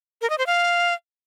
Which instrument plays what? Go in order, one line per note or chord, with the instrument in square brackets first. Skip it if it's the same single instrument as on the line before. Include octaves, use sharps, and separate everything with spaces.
[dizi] A#4
D#5
C5
F5